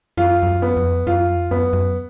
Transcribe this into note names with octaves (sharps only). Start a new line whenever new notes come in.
F#2 F4
F2
F#2
B3
F2
F#2 F4
F2
F#2 B3
F#2